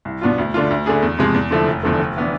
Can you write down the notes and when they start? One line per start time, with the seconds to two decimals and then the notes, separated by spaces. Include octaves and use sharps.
0.05 C2
0.22 B2 B3 D4 F4
0.38 D2
0.54 D3 A3 D4 F4
0.70 D2
0.86 D3 A3 D4 G#4
1.02 E2
1.19 C3 F3 G#3
1.35 E2
1.51 D3 F3 A3 E4
1.68 F1
1.83 E2 D3 F3 A3
1.99 F1
2.17 E3 B3 D4